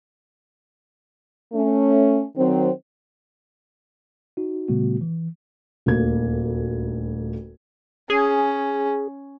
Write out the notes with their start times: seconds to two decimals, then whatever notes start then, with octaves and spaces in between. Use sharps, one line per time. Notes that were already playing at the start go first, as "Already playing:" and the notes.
1.53 A3 C#4
2.37 D#3 F#3 C4
4.37 D#4 F#4
4.68 A#2 C#3 G3 A3 B3 F#4
5.01 E3
5.86 D#1 D2 A#3 G#6
8.10 C#4 G#4